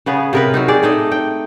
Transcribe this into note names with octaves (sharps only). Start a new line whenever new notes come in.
C#3 B3 G#4
C3 A#4 B4
F#3 C4 D#4
G#4 D5
A3 D#4 D#5
G5